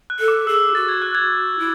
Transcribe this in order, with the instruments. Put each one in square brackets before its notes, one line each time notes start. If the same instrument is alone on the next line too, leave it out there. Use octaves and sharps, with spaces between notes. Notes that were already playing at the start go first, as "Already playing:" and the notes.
[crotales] F#6
[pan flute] A4
[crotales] D6
[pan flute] G#4 [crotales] E6
[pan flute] F#4 [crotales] A6
[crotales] G#6
F#6
G#6
[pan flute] E4